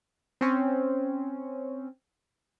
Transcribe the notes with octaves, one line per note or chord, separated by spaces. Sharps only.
C4 C#4